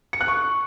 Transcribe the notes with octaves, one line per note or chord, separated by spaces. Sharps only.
C#7
F#6
C#6